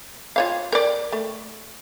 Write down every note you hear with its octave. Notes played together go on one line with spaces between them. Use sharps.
F4 C#5 F5
A#4 D5
A3